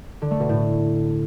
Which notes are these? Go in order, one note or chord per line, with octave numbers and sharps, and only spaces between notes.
D3
A3
B2
A2